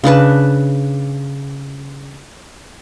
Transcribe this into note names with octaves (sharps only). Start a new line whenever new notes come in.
C#3 D4 B4 A5